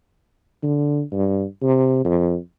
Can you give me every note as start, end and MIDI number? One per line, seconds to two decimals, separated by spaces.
0.63 1.03 50
1.12 1.44 43
1.63 2.00 48
2.05 2.36 41